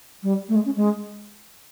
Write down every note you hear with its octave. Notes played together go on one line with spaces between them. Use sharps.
G3
A3
G#3
C#4
G#3